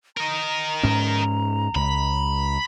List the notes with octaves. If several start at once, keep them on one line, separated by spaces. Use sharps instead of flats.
A#4 D#5 A#5
G#2 C#4
C#2 B5